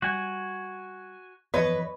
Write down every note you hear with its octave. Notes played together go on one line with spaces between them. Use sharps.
G3 F#4 G#5
F#2 E3 F3 B4 C#5 D#5